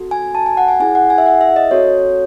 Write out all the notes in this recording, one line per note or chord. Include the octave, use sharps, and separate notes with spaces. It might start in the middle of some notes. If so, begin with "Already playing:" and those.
Already playing: C4 F#4 A4
G#5
A5
G#5
F#5
G#5
C#4 E4 G#4 G#5
F#5
G#5
E5
F#5
E5
D#5
C4 F#4 A4 C#5